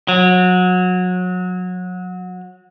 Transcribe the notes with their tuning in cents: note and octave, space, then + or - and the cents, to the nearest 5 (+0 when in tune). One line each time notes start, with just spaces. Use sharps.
F#3 -25